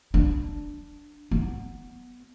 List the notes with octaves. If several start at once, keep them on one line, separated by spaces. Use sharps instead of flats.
D4
B3